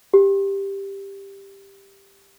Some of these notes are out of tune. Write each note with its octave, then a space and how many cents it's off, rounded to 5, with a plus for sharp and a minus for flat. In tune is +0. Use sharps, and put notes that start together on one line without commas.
G4 +5